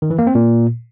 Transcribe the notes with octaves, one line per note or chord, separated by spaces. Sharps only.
D#3
E3
A#3
C4
A#2